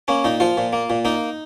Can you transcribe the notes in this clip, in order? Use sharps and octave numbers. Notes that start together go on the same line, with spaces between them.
A#3 C#4
A#2 D#4
F3 F4
A#2
A#3
A#2
A#3 D#4